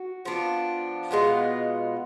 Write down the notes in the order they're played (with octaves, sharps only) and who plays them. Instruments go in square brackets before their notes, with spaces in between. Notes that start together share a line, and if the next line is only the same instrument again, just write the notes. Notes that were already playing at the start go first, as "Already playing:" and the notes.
Already playing: [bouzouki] F#4
F3 B3 D4
B2 G#3 B3 F4